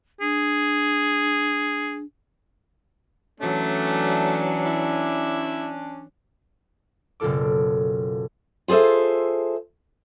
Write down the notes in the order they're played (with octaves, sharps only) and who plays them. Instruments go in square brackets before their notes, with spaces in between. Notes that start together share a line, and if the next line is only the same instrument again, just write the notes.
[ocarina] D4 [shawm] G#4
[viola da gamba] E3 F#3 [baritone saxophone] A3 [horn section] C#4 D4
[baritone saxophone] E4
[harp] F#1 B2 F4 A4 D6
[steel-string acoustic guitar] F4 G#4 A4 C5 E5